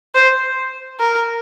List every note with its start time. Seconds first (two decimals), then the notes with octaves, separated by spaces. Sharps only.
0.15 C5
1.00 A#4